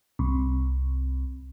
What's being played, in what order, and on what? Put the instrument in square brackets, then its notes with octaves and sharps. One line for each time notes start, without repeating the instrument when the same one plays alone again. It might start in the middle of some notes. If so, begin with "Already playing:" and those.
[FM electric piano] C2